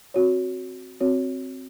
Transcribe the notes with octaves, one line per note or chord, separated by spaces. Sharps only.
C4 F#4 C#5
C4 F#4 C#5